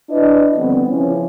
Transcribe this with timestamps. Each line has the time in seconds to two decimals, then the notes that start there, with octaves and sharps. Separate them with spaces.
0.10 D4 E4 B4 D#5
0.56 D3 F3 G3 B3 C4
0.86 C#3 E3 F3 C#4